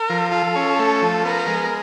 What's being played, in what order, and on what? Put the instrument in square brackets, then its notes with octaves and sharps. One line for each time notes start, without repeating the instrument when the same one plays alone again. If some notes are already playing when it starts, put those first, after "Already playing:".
Already playing: [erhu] A#4
[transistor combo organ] F3
[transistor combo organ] F4 [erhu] A4
[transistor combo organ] C#4
A3
F3
[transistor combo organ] B3 [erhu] A#4
[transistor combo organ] G#3